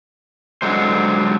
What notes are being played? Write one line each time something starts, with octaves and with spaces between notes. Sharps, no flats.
D3 F#3 G#3 C5